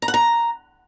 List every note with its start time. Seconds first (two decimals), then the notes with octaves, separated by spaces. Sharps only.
0.02 A#5
0.08 F#5
0.14 A#5